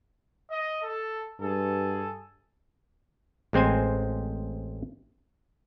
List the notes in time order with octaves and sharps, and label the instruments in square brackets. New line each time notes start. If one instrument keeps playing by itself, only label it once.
[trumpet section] D#5
A4
[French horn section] G2 [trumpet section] G#4 A4
[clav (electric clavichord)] A1 G#3 C4 C5 G#5